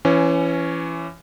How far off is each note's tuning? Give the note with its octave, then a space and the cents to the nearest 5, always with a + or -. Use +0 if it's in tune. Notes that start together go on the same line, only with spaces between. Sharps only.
E3 +25 C#4 +0